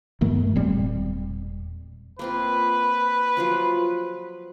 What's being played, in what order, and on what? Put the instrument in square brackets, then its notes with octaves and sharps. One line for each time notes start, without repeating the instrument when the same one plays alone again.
[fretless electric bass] G2 D#3 A3 B3
E1 A#2 G3 C4
[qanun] A#3 C4 F4 [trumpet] B4
[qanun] F3 F#3 F4